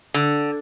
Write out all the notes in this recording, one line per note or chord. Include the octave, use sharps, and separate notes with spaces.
D3